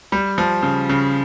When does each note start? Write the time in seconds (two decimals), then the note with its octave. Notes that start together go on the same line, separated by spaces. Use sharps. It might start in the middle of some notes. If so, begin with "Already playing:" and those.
0.12 G3
0.38 F3
0.63 C#3
0.89 C#3